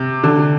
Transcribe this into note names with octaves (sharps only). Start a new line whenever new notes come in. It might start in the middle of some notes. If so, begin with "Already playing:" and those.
Already playing: C3
D3